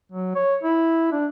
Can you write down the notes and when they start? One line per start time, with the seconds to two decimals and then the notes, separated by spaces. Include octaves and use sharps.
0.12 F#3
0.35 C#5
0.63 E4
1.12 D4